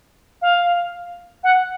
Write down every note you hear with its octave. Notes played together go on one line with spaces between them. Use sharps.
F5
F#5